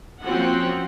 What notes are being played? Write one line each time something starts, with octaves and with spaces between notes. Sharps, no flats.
F3 A#3 C4 C#4 F#4 F#5